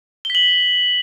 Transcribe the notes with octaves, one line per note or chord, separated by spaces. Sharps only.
B6 F#7 G7